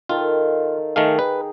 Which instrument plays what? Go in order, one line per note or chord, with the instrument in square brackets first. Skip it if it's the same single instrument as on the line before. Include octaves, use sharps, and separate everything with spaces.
[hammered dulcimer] D#3 A4 F5 [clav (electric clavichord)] F4
[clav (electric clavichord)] D#3 A3 F5 [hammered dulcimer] G#4 G5 A#5
[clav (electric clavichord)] B4